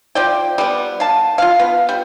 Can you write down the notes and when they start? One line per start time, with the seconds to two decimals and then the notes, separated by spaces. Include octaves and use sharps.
0.15 F3 D5 G5
0.58 G3 B3
1.00 F5 A5
1.38 F4 F5
1.59 B3
1.89 G3